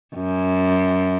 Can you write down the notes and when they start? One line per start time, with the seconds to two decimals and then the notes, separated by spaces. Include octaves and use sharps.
0.15 F#2